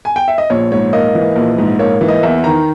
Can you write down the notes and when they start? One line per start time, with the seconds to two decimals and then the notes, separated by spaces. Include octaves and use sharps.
0.05 G#5
0.16 G5
0.28 E5
0.38 D#5
0.50 A#1 C#5
0.72 G#2 C#5
0.93 A#3 D#5
1.15 E3
1.36 A#1
1.58 G#2
1.79 A#3 C#5
2.01 E3
2.08 D#5
2.23 E2 E5
2.44 D#3 A#5